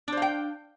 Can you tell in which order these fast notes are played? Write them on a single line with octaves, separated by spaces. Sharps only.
D4 C5 F5 G5